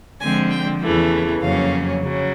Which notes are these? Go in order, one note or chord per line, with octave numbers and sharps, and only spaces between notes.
D3 F3 G#3 C4 G#5
G5
E2 C#3 E3 A3
F2 C#3 F#3 A#3 C#4 F5
C#3 F#3